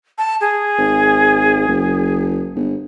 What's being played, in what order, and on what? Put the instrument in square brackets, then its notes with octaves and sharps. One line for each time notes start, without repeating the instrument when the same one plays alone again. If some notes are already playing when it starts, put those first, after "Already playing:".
[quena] A5
G#4
[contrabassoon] G#1
F#1
G1